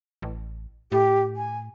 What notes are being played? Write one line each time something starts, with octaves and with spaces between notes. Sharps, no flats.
A1
A2 G4
G#5